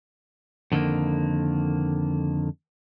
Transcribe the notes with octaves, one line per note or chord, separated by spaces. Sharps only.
F2 D3 D#3 A3 A#3